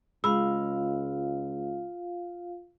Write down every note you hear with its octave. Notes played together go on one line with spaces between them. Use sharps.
C#2 G#3 F4 F5 B5 E6